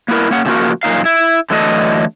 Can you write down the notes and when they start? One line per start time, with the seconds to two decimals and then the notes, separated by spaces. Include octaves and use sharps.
0.08 A#3 B3 E4 A#4
0.31 A#3 C#4 F#5
0.45 A2 C#3 F3 A#3 F#4 A#4
0.83 F#2 A#2 D#4 F5
1.05 E4
1.50 D3 E3 F#3 A3 A4 D#5